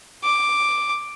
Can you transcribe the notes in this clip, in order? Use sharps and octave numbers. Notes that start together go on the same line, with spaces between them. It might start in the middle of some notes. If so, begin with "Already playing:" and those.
D6